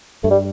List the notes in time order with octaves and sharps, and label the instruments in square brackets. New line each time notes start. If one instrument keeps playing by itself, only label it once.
[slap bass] G2 [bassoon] A3
[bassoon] G3